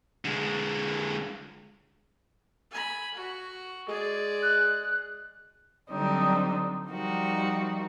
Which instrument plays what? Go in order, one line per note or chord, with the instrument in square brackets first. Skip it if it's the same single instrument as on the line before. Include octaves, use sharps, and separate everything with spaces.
[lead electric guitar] D3 G#3
[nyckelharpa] G#5 B5
F#4
[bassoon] G#3 [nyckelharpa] G#4 D5
[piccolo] F#6
[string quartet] D3 F#3 G3 C4 D4 D#4
F3 G3 D#4 F#4 A#4